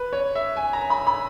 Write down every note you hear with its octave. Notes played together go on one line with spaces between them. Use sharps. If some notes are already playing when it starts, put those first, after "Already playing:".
Already playing: B4
C#5
E5
G#5
A#5
B5
B5